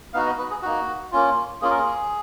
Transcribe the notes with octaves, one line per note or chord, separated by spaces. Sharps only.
B3 D#4 F#4 F5
D#5
B4
G#4
A#3 D#4 F#4
A#3 C#4 F4
A#3 C#4 F4 G#4
A#4
G#4